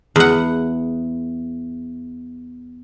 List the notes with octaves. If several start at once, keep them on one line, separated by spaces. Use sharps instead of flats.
E2 F#5